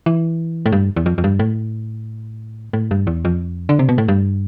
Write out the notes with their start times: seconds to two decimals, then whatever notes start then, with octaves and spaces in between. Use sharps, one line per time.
0.06 E3
0.66 A2
0.72 G2
0.96 E2
1.06 F2
1.18 F2
1.24 G2
1.39 A2
2.73 A2
2.91 G2
3.07 E2
3.25 F2
3.69 D3
3.79 C3
3.89 B2
3.98 A2
4.08 G2